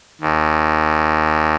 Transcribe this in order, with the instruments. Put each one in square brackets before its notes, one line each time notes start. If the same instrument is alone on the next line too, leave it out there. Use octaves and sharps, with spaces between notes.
[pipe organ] D#2